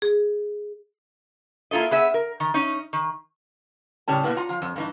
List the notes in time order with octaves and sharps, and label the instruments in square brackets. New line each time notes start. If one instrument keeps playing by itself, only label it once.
[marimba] G#4
[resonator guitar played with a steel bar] A#3 E4 F4 A4 D#5
B3 G#4 E5
A#4
D#3
C#4 D#4
D#3
A2 C#3 G3 C#4 A5
B2 E3 A#3 B3 E4
F4 F#5 A#5
F3 F4
F2
G2 E3 D#4